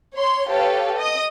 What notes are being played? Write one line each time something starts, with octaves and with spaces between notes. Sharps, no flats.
C#5 C6
G4 A4 B4 C#5 F5
D#5 D#6